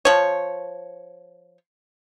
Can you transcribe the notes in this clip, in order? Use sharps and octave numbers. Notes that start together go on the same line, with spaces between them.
F3 C#5